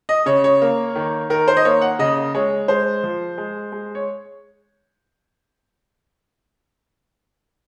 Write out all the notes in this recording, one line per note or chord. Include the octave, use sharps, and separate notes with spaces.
D#5
C#3 C#5
C#5
A#3
D#3
D#3 A#4
C5
D#5
A#3 C#5
F#5
C#3 D#5
G#3 C#5
G#3 C5
F3
G#3
G#3
C#5